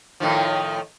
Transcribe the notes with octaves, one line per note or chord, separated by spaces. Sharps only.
A2 D#3 F3